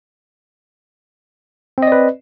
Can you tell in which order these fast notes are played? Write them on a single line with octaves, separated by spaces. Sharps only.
C4 D#5 D5 B4